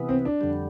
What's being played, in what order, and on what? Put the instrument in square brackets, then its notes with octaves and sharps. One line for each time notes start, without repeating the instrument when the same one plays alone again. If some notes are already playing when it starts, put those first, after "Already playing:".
Already playing: [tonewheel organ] C3 E3 B3
[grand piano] C4
D4
[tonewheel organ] F2 D3 G3